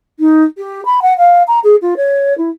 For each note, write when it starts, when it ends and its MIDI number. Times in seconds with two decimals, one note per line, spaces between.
0.19 0.43 63
0.57 0.83 67
0.85 1.00 83
1.02 1.16 78
1.18 1.43 77
1.47 1.59 82
1.64 1.76 68
1.82 1.94 65
1.96 2.36 73
2.38 2.50 64